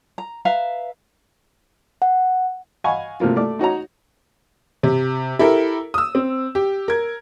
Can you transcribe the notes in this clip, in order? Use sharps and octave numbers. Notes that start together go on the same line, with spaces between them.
A#5
B4 E5 F5 A#5
F#5
D#5 F5 F#5 G#5 B5 C#6
C3 A3 A#3 F4
A3 D5 D6
D#4 F#4 C#5 A#5
C3
E4 G4 A4 A#4
D#6 E6
C4
G4
A#4 G#6